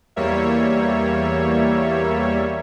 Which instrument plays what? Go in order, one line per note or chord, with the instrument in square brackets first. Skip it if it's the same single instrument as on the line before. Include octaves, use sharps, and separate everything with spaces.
[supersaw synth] E2 G3 A#3 C#5 E5